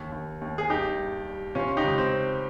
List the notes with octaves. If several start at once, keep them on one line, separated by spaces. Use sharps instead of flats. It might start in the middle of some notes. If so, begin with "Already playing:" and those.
Already playing: D#2
D#2
D#2
G#4
G2 D#4 G4
G2
G3
C3 C#4 F4
D#4 G4
C#2
C4